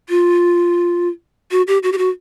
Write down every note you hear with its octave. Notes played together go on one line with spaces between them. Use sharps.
F4
F#4
G4
F#4
G4
F#4